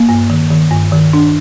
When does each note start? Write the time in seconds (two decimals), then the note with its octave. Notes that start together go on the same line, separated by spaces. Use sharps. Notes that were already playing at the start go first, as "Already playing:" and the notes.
Already playing: A#3
0.09 G2
0.30 D#3
0.50 D#3
0.71 G2
0.92 D#3
1.13 D4